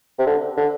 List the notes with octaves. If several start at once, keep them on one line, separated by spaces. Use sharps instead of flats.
C3
D3
D3